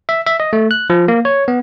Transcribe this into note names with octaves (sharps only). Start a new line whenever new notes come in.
E5
E5
D#5
A3
F#6
F3
A#3
C#5
B3